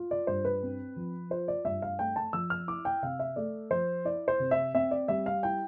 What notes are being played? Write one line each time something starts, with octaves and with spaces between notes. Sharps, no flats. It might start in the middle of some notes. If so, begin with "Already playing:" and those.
Already playing: F4
D5
G2 C5
B4
C4
F3
F4 C5
D5
G2 E5
F5
A3 G5
A5
F3 E6
F6
E4 D6
G5
C3 F5
E5
A3 D5
F3 C5
E4 D5
C5
C3
E5
C4 E5
D5
G3 E5
F5
E4 G5